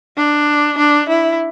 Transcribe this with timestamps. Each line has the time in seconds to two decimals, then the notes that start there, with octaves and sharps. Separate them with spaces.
0.17 D4
0.78 D4
1.09 E4